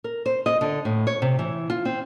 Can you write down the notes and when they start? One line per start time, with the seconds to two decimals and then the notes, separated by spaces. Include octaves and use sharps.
0.04 A#4
0.26 C5
0.46 D#5
0.61 D3
0.85 A2
1.07 C#5
1.22 C3
1.39 E3
1.70 F4
1.85 C4